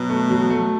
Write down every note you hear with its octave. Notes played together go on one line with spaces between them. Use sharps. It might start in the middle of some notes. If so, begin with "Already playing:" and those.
Already playing: B2 F#3
A3
F#3
A3